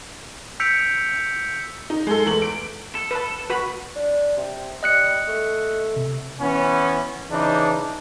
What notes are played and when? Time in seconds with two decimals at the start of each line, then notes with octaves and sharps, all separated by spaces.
0.60 E6 G6 B6 C#7 D7 F7
1.90 D#4
2.07 G#3 A4
2.26 E2 A3 F#7
2.42 D7
2.95 A4
3.11 B4 A5
3.50 F#4 B4 B5
3.96 D4
4.37 C3
4.83 G3 D#5 F#6 C#7
5.28 A3
5.96 C3
6.40 E3 B3 C#4
7.31 C#3 E3 D4 D#4